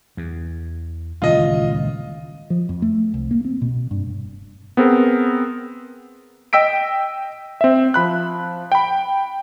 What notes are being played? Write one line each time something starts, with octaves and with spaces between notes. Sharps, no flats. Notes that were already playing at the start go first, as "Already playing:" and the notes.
E2
D#1 C#2 E3 F4 D#5
F3
F2
A3
C2
A#3
C4
B2
G2
F1
B3 C4 G#4 A#4
D#5 G5 E6 B6 D7
C4 E5
F3 B5 F#6
G5 B5